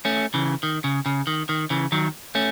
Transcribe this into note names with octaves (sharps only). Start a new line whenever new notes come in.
A3 C#4
C#3 E3
D#3
C#3
C#3
D#3
D#3
C#3 E3
D#3 F#3
A3 C#4